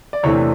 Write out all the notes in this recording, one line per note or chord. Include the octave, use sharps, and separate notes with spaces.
D5
E2 C3 E3 A3 D4 C#5